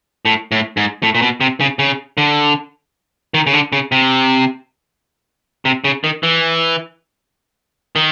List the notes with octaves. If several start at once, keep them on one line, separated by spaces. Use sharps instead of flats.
A2
A2
G#2
A2
A#2
B2
C3
C#3
C#3
D3
D#3
C#3
D3
C#3
C3
C3
C#3
D#3
E3
D#3